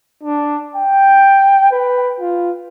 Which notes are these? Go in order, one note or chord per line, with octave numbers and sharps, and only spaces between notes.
D4
G5
B4
F4